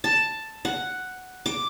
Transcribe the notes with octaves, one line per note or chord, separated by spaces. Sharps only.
A5
F#5
D6